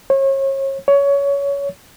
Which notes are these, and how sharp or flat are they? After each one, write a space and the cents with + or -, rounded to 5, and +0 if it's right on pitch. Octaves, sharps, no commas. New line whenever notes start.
C#5 -35
C#5 +20